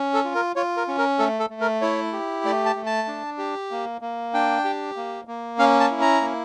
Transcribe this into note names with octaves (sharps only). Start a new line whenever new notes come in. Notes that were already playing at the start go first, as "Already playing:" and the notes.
Already playing: C#4
A4
F4
A#4
F4 C#5
A#4
C#4
A#4
A3 A4
A4
A3
A#4
E4 C#5
G4
A3 D5
A5
A3
A5
D4
G4
A#3
A#3
D4 G5
G4
A#3
A#3
C#4 F5
A5
E4
A#5
A#3